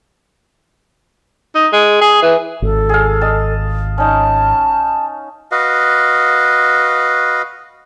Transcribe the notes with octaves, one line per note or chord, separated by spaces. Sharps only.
D#4
G#3
G#4
E3
G#1 A4
G#4 F5
D#5 A5
C#4 D#4 A5
F#4 B4 D#5 F5